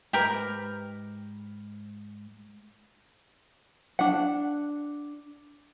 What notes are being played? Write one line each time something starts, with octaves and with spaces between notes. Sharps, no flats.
G#2 G4 A#4 B4
D4 F#5